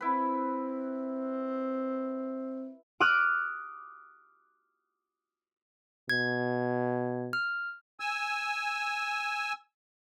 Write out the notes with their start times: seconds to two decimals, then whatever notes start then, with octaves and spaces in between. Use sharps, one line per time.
0.01 C4 E4 B4
3.00 D6 D#6 F6 F#6 D7
6.10 B2 G#6
7.33 F6
8.00 G#5 E6